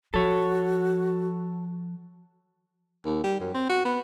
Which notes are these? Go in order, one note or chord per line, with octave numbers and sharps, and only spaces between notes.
F3 F#4 A4 C#5
D#2
G3
F#2
C4
F#4
B3